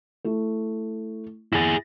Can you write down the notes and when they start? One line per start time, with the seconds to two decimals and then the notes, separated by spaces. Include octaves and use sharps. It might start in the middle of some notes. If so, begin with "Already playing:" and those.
0.25 A3 E4
1.53 E4 G#4 A6 A#6